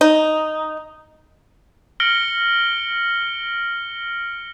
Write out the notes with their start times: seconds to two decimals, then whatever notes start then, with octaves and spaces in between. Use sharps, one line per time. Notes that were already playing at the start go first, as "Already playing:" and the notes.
0.01 D#4
2.00 F6 A#6 C#7 D7 F#7 G7